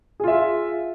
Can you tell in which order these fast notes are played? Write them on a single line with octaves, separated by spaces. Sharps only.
G#4 F4 E5